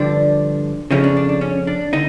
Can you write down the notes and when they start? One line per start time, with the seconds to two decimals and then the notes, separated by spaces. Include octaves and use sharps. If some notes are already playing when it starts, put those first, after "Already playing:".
Already playing: G2 D3 F3 D4
0.91 F2 C#3 F3 A3 C#4 D#4
1.04 D4
1.17 D4
1.29 D4
1.41 C#4
1.67 D4
1.93 D3 D#4